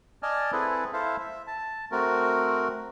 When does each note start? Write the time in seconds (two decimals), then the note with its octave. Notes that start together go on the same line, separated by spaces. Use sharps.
0.23 D5 D#5 G#5 A5 F6
0.52 C4 E4 G#4 A4 B4
0.93 E4 A4 C5 E5 F5
1.19 E5
1.47 A5
1.92 A3 C4 F#4 A#4